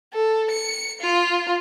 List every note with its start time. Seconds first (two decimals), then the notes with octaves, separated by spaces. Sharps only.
0.13 A4
0.51 C#7
1.01 F4